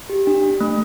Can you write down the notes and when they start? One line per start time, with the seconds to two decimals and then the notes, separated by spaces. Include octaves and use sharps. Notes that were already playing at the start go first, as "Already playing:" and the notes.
0.09 G4
0.27 D4
0.43 D4
0.60 A3